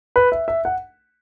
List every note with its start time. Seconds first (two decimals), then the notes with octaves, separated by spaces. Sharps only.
0.16 B4
0.32 E5
0.48 E5
0.65 F#5